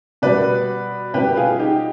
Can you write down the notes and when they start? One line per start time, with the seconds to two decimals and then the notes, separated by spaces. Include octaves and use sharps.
0.22 B2 G3 B4 D5
1.14 B2 G3 G4 B4
1.37 F4 G#4
1.59 D#4 G4